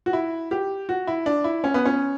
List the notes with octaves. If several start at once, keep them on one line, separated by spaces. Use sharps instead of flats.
F#4
E4
G4
F#4
E4
D4
E4
C#4
B3
C#4